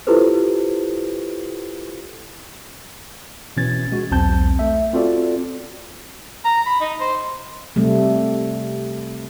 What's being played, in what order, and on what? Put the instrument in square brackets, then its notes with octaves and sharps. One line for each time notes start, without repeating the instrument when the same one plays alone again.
[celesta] E4 F4 G4 A4 B4 C5
[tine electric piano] B2 E3 C#4 G#6 A6
G#3 F#4
B1 E2 C4 A5 G6
A3 E5
C4 F4 F#4 A4 D5
[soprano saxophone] A#5
B5
D#4
C5
[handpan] C3 G3 A3